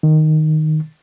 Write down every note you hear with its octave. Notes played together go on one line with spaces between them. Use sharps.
D#3